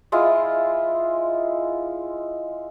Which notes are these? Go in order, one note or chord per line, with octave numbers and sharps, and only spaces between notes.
G#3 E4 F4